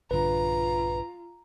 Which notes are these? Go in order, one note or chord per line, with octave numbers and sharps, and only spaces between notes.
A#1 G2 D3 F4 B4 A#5